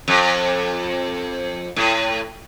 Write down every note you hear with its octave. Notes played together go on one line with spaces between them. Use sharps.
F2
A2